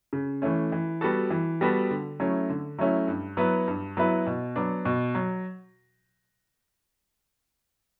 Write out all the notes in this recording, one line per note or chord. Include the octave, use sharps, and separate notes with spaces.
C#3
E3 A3 C#4
E3
G3 B3 F#4 A4
E3
G3 B3 F#4 A4
D3
F#3 A3 C#4 E4
D3
F#3 A3 C#4 E4
G2
F#3 B3 E4 B4
G2
F#3 B3 E4 B4
B2
F#3 B3 D4
B2
F#3